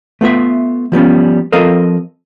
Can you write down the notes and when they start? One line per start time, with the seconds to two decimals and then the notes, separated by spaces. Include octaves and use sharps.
0.21 A3 B3 F4 E5
0.92 F3 G3 B3 C#4
1.52 F3 C4 A4 A#4 D#5 F5